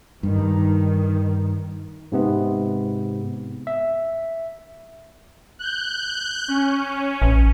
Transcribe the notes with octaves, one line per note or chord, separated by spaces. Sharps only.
G2 D#3
G#2 C3 B3
E5
F#6 G6
C#4
A1